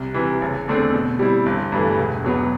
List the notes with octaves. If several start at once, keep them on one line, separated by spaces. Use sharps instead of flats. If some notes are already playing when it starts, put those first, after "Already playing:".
Already playing: C2
C3 E3
F#1
E2 D3 A3 C4
B2
G3 C4 E4
G1
G2 E3 A3
E1
E2 B2 F#3 B3